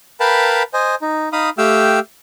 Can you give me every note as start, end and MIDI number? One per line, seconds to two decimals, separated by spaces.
0.20 0.63 70
0.20 0.63 71
0.20 0.63 77
0.20 0.63 79
0.20 0.63 81
0.20 0.63 83
0.74 0.95 72
0.74 0.95 75
0.74 0.95 80
1.02 1.29 63
1.33 1.50 63
1.33 1.50 77
1.33 1.50 83
1.33 1.50 87
1.58 1.99 57
1.58 1.99 67
1.58 1.99 77
1.58 1.99 79
1.58 1.99 88